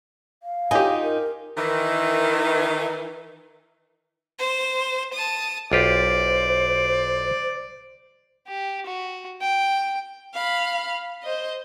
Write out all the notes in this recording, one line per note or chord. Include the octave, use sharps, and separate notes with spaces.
F5
D#4 F4 G4 D#5 G#5
A#4
D#3 E3
C5
A5 D#6
B1 F4 G4 C5 D5
G4
F#4
G5
F5 B5
C5 D#5